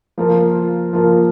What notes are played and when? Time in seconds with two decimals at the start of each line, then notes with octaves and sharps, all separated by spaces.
0.18 F3 A#3 F4 A#4
0.93 F3 A#3 F4 A#4